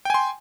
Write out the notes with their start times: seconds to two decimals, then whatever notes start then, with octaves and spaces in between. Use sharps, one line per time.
0.05 G5
0.10 G#5
0.14 C6